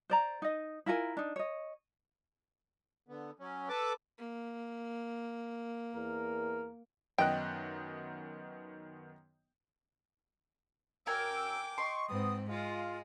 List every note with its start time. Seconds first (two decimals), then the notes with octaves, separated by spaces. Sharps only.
0.10 C5 D5 A#5
0.42 D#4 D#5
0.86 E4 F4 A#4 G#5
1.17 D4 D#4
1.36 C#5 D#5
3.08 D3 B3
3.39 F#3 C#4
3.69 A4 B4 A5 D6
4.18 A#3
5.94 E2 A#4
7.18 F#2 D#3 B3 D#5 G5 F#6
11.07 F#2 A#4 G5 G#5 D6 E6
11.78 D#5 C6 C#6
12.10 G#2 B3 C4 D#6
12.50 G#3 F4